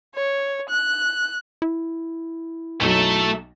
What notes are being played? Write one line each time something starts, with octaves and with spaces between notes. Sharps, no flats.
C#5
F#6
E4
B1 F#3 A3 A4